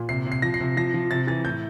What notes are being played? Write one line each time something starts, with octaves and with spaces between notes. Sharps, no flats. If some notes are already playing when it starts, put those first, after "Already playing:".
Already playing: A#2
C3 C7
C3
C7
F3 A#6
C7
C3
F3 A#6
F3
C3 A6
E3 A6
A2 G6